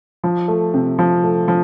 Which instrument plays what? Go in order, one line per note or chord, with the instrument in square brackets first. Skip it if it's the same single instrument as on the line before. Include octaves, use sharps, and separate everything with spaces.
[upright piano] F3
A3
C3
F3
A3
F3